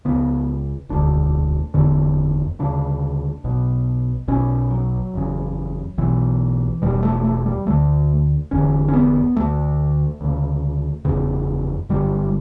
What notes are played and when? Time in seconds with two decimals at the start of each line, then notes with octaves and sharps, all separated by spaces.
0.05 C#2 C#3 B3
0.89 E1 D2 D3 D4
1.74 F#1 E2 D3
2.59 D2 C#3 D4
3.44 B1 B2
4.28 B1 B2 C#4
4.71 F#3
5.14 F#1 E2 C#3
5.98 B1 B2 E3
6.82 E1 E2 B2 G3
7.03 A3
7.24 A3
7.46 G3
7.67 D2 D3 A3
8.51 F#1 E2 D3 C#4
8.88 C#4
8.94 B3
9.36 D2 D3 A3
10.21 D2 C#3
11.05 F#1 E2 C#3
11.89 G1 F#2 D3 G3